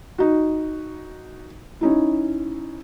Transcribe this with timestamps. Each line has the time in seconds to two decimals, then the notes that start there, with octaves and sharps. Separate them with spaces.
0.18 D#4 F#4
1.81 C#4 D#4 E4